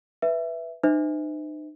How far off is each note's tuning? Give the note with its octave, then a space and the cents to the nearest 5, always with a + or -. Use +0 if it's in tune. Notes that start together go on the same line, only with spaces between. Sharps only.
B4 +0 E5 +5
D#4 -40 C5 -35 E5 -30